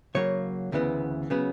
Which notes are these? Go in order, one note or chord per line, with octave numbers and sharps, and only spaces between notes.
C#3 F#3 A#3 C#5
D2 C#3 E3 B3
C#3 F#3 B3